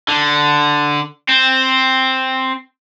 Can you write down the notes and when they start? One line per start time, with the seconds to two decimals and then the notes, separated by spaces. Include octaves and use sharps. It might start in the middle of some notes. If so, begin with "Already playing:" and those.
0.08 D3
1.28 C4